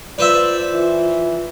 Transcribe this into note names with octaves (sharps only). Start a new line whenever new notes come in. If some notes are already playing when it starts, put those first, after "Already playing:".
F4 B4 C5 D5 E5
E3